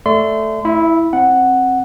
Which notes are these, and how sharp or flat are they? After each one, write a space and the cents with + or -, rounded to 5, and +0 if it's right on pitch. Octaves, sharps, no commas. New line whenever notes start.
A3 +0 D5 +0 C6 -30
E4 -10 E5 +30
C4 +25 F#5 +0